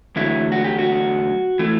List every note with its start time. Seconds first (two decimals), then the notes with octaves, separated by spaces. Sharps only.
0.16 E2 D3 F#3 A3 E4
0.52 F#4
0.64 G4
0.78 F#4
1.59 E3 A3